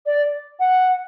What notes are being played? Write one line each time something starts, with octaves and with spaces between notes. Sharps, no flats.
D5
F#5